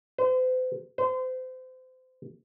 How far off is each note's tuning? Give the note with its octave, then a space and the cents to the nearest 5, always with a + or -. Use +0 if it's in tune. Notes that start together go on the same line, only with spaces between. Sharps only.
C5 -40
C5 -30